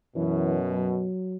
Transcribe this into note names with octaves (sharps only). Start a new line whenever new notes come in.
F#2 B2 E3
F#3